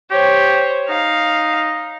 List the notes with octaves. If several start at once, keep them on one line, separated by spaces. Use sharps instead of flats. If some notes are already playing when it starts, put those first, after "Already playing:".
G4 C5 C#5
D#4 F5